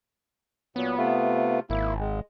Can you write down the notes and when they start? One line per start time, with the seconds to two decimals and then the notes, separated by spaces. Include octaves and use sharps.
0.76 A#2 F#3 B3
0.97 C3 A3 F4
1.70 G#1 A#3 E4
2.00 G#3